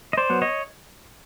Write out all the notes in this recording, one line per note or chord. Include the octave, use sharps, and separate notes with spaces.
D#5
C5 D5
F#3 B3
C#5 D#5